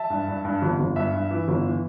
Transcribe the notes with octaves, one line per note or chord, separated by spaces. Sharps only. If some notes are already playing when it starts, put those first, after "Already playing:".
Already playing: E5 A5
G2
G2
G2
G1
G1
G2 E5
G2
E3
G1
E3